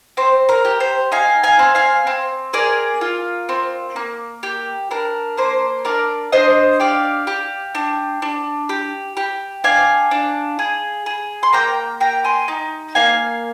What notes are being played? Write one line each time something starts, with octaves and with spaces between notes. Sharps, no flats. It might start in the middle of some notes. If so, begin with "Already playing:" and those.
C4 C5
A#4
G4
C5
D#4 F5 G#5
F5 G#5
C4
F5 G#5
C4
G#4 A#4 D5
F4
C4
A#3
G4
D4 A#4
A#3 C5
D4 A#4 D5
D4 C5 D#5
G4 D5 F5
G4
D4
D4
G4
G4
D4 F5 G#5
D4
G#4
G#4
C6
A#3 G5 A#5
G4 G5 A#5
G#5 C6
D#4
A#3 F5 G#5